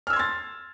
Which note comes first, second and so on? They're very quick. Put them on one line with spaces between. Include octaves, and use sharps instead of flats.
F6 E6 G#6 C6 A6